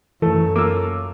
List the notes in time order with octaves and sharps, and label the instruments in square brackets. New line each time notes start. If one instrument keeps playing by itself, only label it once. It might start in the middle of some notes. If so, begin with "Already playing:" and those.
[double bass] F#2 [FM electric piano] E3 [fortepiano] A3 [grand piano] A4
[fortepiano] A#3 F4 [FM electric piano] D6 E6